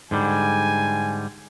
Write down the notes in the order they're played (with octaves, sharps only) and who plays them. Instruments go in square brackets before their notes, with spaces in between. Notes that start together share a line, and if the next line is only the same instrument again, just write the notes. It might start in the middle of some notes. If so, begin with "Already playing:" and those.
[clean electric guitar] G#2 D3 G3 [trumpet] G#5